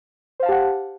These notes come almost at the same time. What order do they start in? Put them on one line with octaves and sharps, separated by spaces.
C5 F5 A5 G4 F#5